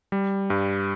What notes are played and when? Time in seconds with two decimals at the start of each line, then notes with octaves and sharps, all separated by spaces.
0.12 G3
0.50 G2